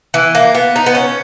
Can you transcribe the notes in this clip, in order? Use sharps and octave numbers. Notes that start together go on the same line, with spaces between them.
E3
A#3
B3
D#4
B3
C#4